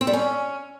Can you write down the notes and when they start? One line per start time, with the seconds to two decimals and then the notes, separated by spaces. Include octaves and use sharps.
0.01 C4
0.07 G3
0.13 C#4